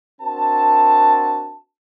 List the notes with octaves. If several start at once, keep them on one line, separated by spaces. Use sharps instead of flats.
C4 D4 F#4 A#4 A5